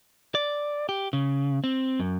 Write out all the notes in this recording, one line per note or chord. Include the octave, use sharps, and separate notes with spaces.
D5
G4
C#3
C4
F#2